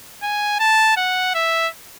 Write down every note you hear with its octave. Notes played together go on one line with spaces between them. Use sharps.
G#5
A5
F#5
E5